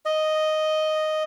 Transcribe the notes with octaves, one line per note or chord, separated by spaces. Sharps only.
D#5